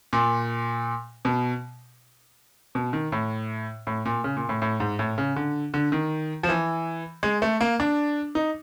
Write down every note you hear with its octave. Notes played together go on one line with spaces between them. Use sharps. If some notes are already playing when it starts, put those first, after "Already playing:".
A#2
B2
B2
D#3
A2
A2
A#2
C#3
A#2
A2
A2
G#2
A2
C#3
D3
D3
D#3
F3
E3
G#3
A3
A#3
D4
D#4